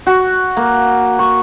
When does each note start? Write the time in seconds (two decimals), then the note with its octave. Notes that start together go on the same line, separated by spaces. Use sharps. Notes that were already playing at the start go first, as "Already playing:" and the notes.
0.06 F#4
0.57 A#3
1.19 C#6